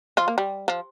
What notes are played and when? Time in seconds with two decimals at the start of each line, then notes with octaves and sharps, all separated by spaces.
0.17 F3 F4
0.28 A#3
0.38 G3
0.68 F3